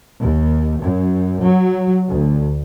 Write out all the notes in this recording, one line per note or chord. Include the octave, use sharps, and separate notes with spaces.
D#2
F#2
F#3
D2